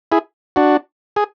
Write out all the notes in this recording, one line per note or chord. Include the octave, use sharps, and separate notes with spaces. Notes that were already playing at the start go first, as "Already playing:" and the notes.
E4 G#4
D4 F#4
G#4